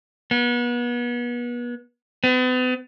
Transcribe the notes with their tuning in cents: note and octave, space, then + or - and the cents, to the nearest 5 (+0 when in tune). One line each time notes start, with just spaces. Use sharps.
B3 -35
B3 +40